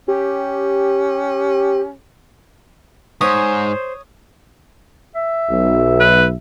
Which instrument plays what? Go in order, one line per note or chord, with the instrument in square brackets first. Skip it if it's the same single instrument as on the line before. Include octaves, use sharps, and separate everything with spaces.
[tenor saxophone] C#4 [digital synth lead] G4
[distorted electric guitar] G#2 [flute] C5 [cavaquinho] C#5 [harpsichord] D#6
[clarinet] E5
[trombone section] B1
[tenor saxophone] B4